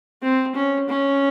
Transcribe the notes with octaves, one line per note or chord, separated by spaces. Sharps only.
C4
C#4
C#4